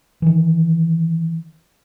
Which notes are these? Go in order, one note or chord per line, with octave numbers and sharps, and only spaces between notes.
D#3 E3